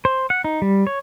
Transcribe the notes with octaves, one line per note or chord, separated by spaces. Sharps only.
C5
F#5
D#4
G3
C#5